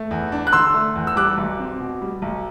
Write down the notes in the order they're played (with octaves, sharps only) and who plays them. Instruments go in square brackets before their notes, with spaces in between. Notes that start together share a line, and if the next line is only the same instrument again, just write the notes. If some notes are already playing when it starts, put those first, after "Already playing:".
Already playing: [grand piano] A3
E2
D4
F#6
D3 C6 E6
A3
E2
E6
G3 D6 F#6
B1
C4
B2
G3
B1